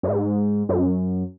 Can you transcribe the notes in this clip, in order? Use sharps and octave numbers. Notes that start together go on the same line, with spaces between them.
F#2
G#2
F#2